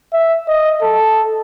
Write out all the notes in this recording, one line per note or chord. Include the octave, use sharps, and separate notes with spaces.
E5
D#5
A4